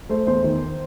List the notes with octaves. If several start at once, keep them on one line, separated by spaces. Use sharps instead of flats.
A3 C5
E2 C5
D#3